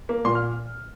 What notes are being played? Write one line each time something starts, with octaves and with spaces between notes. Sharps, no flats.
A#3
A#2 C6
F6